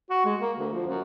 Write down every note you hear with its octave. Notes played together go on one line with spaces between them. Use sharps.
F#4
G#3
A#3
D2
F3
F#2